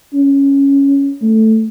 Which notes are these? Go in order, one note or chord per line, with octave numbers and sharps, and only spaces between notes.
C#4
A3